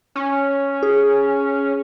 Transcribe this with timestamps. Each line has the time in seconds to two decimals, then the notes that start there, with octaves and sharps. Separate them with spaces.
0.15 C#4
0.83 G#4